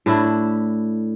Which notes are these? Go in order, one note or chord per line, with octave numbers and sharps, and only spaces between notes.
A2 D4 E4